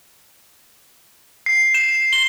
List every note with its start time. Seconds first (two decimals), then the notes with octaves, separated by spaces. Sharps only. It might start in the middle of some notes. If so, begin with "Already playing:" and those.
1.46 C7
1.74 E7
2.13 G7